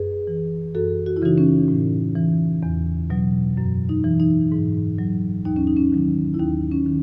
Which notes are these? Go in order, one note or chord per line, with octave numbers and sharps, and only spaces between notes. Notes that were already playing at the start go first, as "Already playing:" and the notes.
Already playing: F#2 G#4 B4
E3
F#2 F#4 A4
F#4
E4
C#3 E3 D#4 F#4
C#4
A2
E3
E2
B2 F#3
F#2
D#4
E3
D#4
G#2
F#3
D#2 D#4
C#4
D#4
C#4
D#3 F#3
E4
D#2 D#4
C#4
D#3